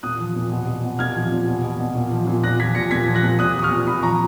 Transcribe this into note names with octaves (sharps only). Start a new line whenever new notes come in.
A#2 D#6 F#6
F3
A#2
B2
B2
B2
A#2 F6 G#6
F3
A#2
B2
B2
B2
A#2
F3
A#2
A#2 F#6 A#6
F3 G#6 B6
A#2 A#6 C#7
A#2 G#6 B6
F3
F#6 A#6
A#2
A#2 D#6 F#6
F3 D#6
C#6 F6
A#2
A#2 B5 D#6
F3 A#5 C#6